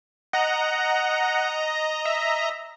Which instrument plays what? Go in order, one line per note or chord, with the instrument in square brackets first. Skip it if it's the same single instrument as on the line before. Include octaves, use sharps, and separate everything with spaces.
[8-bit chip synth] D#5 A#5 [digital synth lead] F#5
[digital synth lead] E5